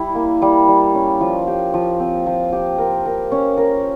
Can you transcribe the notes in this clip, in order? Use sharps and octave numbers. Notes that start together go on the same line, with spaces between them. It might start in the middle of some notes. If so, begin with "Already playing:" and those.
Already playing: G3 E4
A#3
G3
G3
C#4
F3
G4
F3
C4
F3
G4
A#4
A#4
C#4
A#4